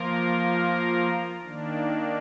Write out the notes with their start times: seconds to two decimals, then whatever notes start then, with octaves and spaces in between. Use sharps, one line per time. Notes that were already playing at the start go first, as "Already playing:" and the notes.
Already playing: F3 A#3 F4 A#4
1.44 D#3 A#3 D4